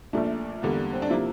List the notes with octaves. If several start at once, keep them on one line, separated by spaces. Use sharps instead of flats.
A#1 A#2 A3 D4
E2 D3 G3 A#3
C4
D4
C3 F3 A#3 E4